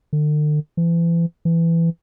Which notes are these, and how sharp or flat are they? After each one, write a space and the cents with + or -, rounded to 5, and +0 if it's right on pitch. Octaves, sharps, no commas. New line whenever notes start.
D3 +40
E3 +35
E3 +15